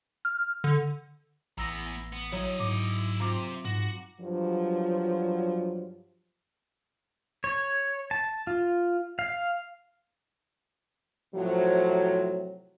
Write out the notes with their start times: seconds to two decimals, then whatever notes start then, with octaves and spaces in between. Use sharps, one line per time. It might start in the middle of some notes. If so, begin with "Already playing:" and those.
0.25 F6
0.64 D3
1.58 A1 E2 B3 A#5 E6 A#6
2.12 B3
2.32 F#3 E4 C#5 D#5 A#5
2.60 G#2 D6
3.20 C3 C4 F4 A#5 D6
3.65 G#2 F#4
4.20 G2 F3 F#3
7.44 C#5
8.11 A5
8.47 F4
9.19 F5
11.34 A2 C3 F3 F#3